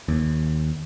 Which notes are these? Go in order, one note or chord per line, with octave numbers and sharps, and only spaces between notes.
D#2